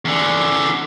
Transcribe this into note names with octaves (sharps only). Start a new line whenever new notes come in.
E2 D3